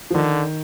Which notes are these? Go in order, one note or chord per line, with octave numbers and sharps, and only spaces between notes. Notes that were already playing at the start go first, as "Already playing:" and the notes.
F3
D3 D#3